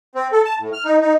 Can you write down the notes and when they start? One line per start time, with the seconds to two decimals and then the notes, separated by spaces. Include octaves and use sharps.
0.15 C4
0.32 A4
0.45 A5
0.60 A2
0.73 F6
0.85 D#4
1.01 D#4